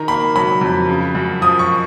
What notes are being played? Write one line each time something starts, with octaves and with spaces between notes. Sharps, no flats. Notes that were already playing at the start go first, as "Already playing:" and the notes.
Already playing: D#3 A#5
A#3 B5
F#3 B5
F2
C#3
F#2
F3 D#6
C#6